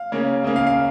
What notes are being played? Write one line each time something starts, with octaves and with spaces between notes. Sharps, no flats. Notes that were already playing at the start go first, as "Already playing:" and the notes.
Already playing: F5
C#3 A#3 C#4
C#3 A#3 C#4
F5
F5